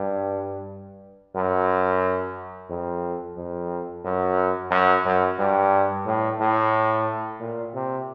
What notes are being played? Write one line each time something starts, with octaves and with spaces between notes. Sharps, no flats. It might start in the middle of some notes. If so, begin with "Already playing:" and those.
Already playing: G2
F#2
F2
F2
F#2
F#2
F#2
G2
A2
A2
A#2
C3